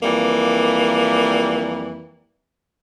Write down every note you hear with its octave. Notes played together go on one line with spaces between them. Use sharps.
F2 E3 G3 A#3